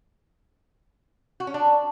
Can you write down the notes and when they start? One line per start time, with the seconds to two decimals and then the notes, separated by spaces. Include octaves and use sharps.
1.40 F#4
1.47 C#4
1.54 D4